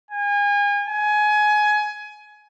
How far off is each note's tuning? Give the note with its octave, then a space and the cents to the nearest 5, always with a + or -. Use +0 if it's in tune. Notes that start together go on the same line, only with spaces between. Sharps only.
G#5 -35
G#5 +20